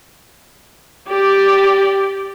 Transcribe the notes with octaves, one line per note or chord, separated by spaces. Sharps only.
G4 D5